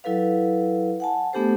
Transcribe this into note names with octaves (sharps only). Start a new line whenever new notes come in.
F#3 E4 A4 B4 F5
F#5 G#5 A5
A3 B3 D4 G4 A4 C5